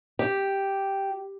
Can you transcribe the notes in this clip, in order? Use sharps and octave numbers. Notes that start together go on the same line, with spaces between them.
G4